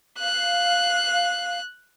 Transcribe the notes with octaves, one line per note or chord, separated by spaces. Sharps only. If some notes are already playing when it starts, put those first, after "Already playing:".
F5 F#6